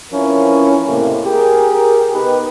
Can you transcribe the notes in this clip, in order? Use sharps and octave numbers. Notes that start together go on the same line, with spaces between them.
E3 F3 C4 C#4 E4 A#4
C#2 A2 C3 A#3 E4
G4 G#4 A#4
B2 B3 D#4 G4 B4